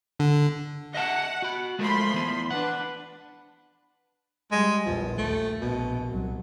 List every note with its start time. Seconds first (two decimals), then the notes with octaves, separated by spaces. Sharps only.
0.20 D3
0.94 D#5 E5 F#5 A5
1.42 F#4 B5
1.79 F3 G#3 A3 A#4 B5 C6
2.14 E3 B3
2.50 D4 B4 F#5
4.52 G3 G#3
4.86 A#1 E2 F3
5.18 D#2 A3
5.61 A#1 B2
6.09 C2 F#3